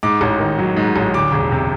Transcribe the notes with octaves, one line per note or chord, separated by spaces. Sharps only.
G#2 D6
A1
D#3
F#3
G#2
A1
D2 D6
E1
C3